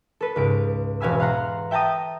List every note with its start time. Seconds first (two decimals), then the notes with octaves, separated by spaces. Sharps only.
0.21 A4 B4
0.36 C#2 G#2 D7
1.00 E1 B2 F5 G#5 B5 E6
1.20 F5 F#5 A#5 C6
1.71 E5 G5 A5 A#5 D#6